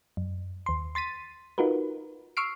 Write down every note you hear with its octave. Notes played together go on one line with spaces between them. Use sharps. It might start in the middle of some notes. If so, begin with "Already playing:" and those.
F#2
D#2 C6
C6 A6 B6 D#7
D#4 F4 F#4 A#4 B4
C#6 E6 F6 C7 D7